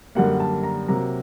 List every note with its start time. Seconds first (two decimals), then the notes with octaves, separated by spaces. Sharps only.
0.15 F#2 D3 G3 A#3 F#5
0.40 A5
0.63 A#5
0.88 C3 F#3 A#3 A#5